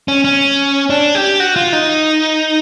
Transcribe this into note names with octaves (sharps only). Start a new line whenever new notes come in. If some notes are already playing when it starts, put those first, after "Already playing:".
C#4
C#4
D4
G4
F#4
F4
D#4